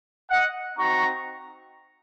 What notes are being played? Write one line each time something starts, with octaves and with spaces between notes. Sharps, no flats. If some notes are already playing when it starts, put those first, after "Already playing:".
D#5 F#5
C4 D#4 F#4 A#5 C#6